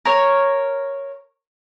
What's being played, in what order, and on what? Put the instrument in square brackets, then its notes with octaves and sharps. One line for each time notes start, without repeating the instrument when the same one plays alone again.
[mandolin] A#4 C#5